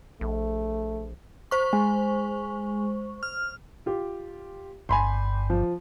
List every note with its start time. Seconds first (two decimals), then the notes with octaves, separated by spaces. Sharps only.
0.21 A#1 A3
1.51 C5 C#6
1.73 G#3
3.23 F6
3.86 F4 G4
4.89 G1 G2 G#5 B5 C6
5.50 F3